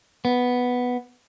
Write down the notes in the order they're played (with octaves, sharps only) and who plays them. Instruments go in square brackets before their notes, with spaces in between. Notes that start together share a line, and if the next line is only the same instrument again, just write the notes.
[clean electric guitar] B3